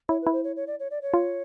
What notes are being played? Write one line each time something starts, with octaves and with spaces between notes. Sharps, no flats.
E4 C#5
B4
E4
C5
C#5
C#5
D5
C#5
D5
C#5
F4